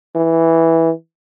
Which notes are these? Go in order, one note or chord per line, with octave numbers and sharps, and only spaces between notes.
E3